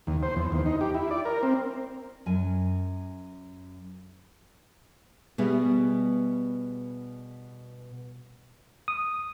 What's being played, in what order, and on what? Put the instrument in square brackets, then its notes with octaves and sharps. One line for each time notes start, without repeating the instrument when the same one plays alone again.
[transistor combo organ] D#2
C5
E2
D#2
D#4
G4
E4
D5
A#4
C4
[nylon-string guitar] F#2 G#5
B2 G3 B3 G#4 E5
[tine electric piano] D#6